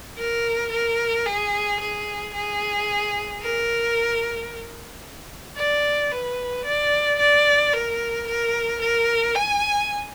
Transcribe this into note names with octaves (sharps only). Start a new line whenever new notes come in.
A#4
A#4
G#4
G#4
G#4
A#4
D5
B4
D5
D5
A#4
A#4
A#4
G#5